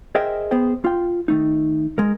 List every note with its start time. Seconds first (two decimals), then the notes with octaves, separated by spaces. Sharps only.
0.15 G#4 A#4 C5 D#5 E5 G5
0.51 B3 G#4 C5 G5
0.84 F4 G5
1.28 D#3 A3 D#4
1.98 G#3 A#4